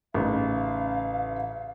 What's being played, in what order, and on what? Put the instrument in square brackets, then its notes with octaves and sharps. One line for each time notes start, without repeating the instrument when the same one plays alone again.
[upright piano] A1 C#3 D#4 [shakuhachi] F5